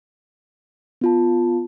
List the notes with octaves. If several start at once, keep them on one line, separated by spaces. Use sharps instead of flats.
B3 F4 A5